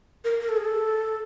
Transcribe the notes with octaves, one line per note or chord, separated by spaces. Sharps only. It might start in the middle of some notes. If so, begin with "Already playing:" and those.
A#4
A#4
A4
G#4
A4